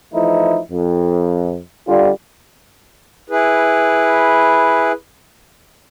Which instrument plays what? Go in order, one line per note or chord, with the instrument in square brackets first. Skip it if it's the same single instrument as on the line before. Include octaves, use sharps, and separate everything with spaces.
[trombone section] E3 F3 A3 D#4 E4
F2
D3 G3 F4
[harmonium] E4 G#4 B4